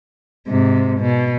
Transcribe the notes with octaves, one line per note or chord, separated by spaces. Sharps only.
G#2 C3
B2